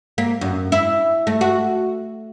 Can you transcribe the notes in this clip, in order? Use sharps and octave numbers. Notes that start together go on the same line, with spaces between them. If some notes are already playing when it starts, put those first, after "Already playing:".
A#3
F#2
E4
A3
F#4